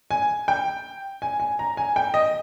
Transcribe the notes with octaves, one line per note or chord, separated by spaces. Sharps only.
G#5
G5
G#5
G#5
A#5
G#5
G5
D#5